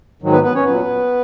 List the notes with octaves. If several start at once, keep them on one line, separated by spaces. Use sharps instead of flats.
G#2 D#3 F#3
B3 B4
B3 B4
C#4 C#5
A#2 F#3 B3 B4